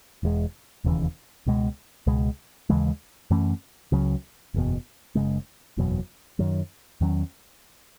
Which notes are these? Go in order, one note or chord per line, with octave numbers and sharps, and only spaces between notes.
E1 E2 D#3 G#3
E1 D#2 C#3 E3
C#2 B2 G#3
C#2 B2 G#3
D#2 C#3 E3 G#3
F#2 E3 A3 C#4
C#2 C#3 F#3 C#4
F#1 E2 B2
F#1 E2 C#3 G#3
F#1 E2 B2 F#3
F#2 D#3 F#3
E2 D#3 F#3 C#4